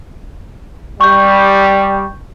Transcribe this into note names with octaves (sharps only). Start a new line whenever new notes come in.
G3 C#6 G6